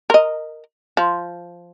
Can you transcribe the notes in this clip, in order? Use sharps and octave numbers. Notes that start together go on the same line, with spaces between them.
A#4 D#5
F3